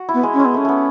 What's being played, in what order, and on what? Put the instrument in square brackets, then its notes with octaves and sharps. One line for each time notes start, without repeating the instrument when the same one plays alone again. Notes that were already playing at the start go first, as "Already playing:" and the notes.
Already playing: [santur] F#4
E4
[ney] B3
[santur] G#3
[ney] C#4
[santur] G#3
[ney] B3
[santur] A3 [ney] C#4
[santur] A3 B3